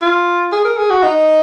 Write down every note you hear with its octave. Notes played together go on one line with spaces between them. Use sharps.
F4
G#4
A#4
G#4
F#4
D#4